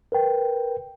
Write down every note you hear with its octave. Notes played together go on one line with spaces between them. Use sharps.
A#4 B4 G5